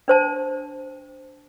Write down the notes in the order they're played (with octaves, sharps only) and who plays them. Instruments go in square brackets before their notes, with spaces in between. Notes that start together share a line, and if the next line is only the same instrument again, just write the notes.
[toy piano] D4 C5 A5